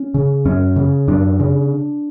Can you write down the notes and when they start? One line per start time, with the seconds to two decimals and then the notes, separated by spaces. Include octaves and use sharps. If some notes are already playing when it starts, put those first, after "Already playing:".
Already playing: C#4
0.14 C#3
0.45 F#2 C#4
0.76 C#3
1.08 F#2 D4
1.40 C#3